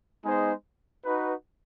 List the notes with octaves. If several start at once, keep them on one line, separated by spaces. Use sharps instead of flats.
G#3 B3 D#4 G#4 C5
D#4 F#4 B4